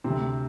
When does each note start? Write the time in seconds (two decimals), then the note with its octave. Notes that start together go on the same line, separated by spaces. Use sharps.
0.04 D2 C3 C4